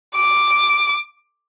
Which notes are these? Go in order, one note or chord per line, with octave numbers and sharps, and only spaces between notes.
D6